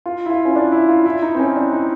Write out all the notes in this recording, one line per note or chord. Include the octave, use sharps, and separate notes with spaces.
F4
E4
F4
C#4
D4
E4
F4
E4
D#4
C4
C#4
D4
D#4